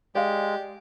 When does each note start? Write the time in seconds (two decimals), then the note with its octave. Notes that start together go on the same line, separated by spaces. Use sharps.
0.15 G#3 G4 D5 F5